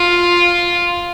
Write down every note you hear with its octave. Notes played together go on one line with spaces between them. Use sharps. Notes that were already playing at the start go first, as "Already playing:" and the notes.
Already playing: F4